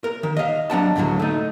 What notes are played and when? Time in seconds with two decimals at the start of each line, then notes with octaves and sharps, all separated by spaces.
0.04 A#4
0.23 D#3
0.37 D#5 F5
0.70 F#3 D4 F#5 A5
0.96 C#2 A2 D3 D#3 F#3
1.20 A3 D#4